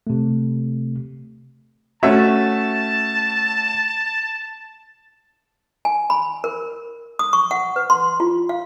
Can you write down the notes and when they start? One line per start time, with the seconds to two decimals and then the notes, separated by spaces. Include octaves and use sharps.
0.07 C3 A3
2.03 A3 C#4 F#4 E5 A5
5.85 G#5
6.10 B5
6.44 A#4
7.19 D#6
7.33 C#6
7.51 F#5
7.76 B4
7.90 C6
8.20 F4
8.49 F5